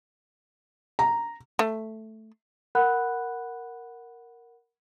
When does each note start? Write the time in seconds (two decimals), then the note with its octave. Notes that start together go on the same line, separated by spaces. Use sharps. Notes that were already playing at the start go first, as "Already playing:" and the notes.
0.99 A#5
1.59 A3
2.75 A#4 F#5 B5 F#6